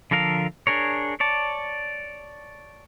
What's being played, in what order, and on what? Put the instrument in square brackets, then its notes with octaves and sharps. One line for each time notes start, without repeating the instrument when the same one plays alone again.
[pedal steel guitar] D3 F3 A4 A#4 F5
D4 G#4 A#4 C#5
C#5 D5 A5